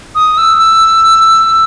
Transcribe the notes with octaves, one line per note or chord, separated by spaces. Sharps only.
D#6
E6
E6
E6